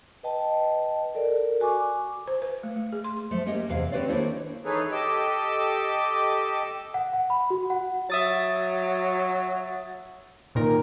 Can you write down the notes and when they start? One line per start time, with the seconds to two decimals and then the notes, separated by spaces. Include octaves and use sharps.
0.23 B4 D#5 G5 A5
1.15 A4 A#4 D5
1.60 F#4 G#5 C#6 D6
2.28 C5
2.42 B4
2.63 A3
2.76 A3
2.92 G#4
3.04 C6
3.31 F3 A3
3.46 A#3 C#4 G4 D#5
3.69 E2 C3 F5
3.92 C4 G4 B4 C#5 D5 F5
4.08 D#3 A#3 D4 E4 C5 C#5
4.65 E3 D#4 G#4 A4 B4 C#5
4.92 G4 A4 D#5 D6 E6
6.94 F#5
7.13 F#5
7.30 B5
7.50 F#4
7.70 F#5
8.10 F#3 E5 D#6 A6
10.55 A#2 D#3 A#4